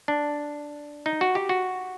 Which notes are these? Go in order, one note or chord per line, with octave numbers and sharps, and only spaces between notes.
D4
D#4
F#4
G4
F#4